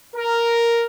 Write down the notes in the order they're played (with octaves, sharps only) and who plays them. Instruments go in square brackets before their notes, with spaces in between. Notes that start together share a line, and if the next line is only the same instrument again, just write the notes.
[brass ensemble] A#4